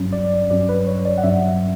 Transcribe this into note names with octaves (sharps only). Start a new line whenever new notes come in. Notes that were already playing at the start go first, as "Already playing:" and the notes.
Already playing: G2 F#3 C#4
D5
G2 F#3 C#4 D5
B4
C#5
D5
F#5
G2 F#3 C#4 E5